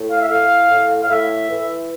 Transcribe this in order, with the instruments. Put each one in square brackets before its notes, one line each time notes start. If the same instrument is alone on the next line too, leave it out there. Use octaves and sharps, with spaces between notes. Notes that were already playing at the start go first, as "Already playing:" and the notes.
Already playing: [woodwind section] A2
F5
E5
A2 F5
A2
F5
A2 E5
E3